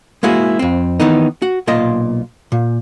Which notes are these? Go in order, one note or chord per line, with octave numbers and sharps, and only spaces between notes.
G#3 A#3 E4 F#4 G#4
F2 C4
D#3 E3 B3 D#4
F#4
B1 A#2 F4 D#5
A#2